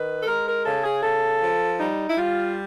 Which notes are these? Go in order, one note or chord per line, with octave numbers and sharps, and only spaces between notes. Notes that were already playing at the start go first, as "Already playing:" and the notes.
Already playing: D#3 B4
A4
G#3 A#4
A#4
C#3 A4
G#4
C#3 A4
F3
G3 D#4
E4
G3 F4